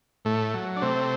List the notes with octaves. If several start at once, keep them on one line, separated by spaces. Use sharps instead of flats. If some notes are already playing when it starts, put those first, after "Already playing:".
A2 A3
F#3
D4
C3 A3 C4